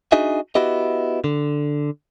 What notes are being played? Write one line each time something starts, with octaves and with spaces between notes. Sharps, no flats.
D4 D#4 F#4 G#4 D#5 E5
B3 E4 F#4 G4 D#5
D3